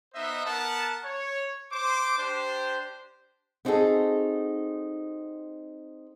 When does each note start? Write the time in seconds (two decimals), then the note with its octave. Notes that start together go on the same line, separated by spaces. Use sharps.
0.15 B3 D#4 C5 D#5 E5
0.46 B3 A#4 F#5 A5
1.05 C#5
1.72 C5 D6
2.18 D4 G4 C5
3.65 B3 C4 D#4 F#4 G#4 A4